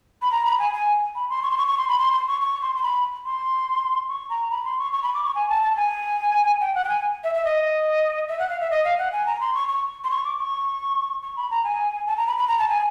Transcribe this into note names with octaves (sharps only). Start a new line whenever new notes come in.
B5
A#5
B5
G#5
G#5
B5
C6
C#6
C6
C#6
C#6
C6
B5
C6
C6
C#6
C#6
C6
C6
B5
C6
C#6
A#5
B5
C6
C#6
C#6
B5
D6
C#6
G#5
A5
A5
G#5
G5
F#5
G5
G#5
E5
E5
D#5
E5
F#5
F5
E5
D#5
F5
F#5
G#5
A#5
C6
C#6
C#6
C6
C#6
D6
C#6
C#6
B5
A#5
G#5
A5
A#5
B5
B5
A#5
A5
G#5